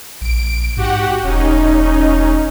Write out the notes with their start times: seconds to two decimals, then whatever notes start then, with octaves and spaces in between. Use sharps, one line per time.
0.21 A#1 D7
0.77 G#2 F#4 G4 F#5
1.23 E1 C#4 D#4